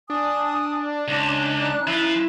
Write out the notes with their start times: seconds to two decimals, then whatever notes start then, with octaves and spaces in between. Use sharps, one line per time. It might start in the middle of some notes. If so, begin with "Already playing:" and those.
0.10 D4 G#5 A5 D#6
1.08 C#2 C#4 D#4 F#6
1.87 F3 E4 F4